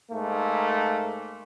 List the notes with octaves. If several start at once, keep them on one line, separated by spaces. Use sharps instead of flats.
G#2 A3 A#3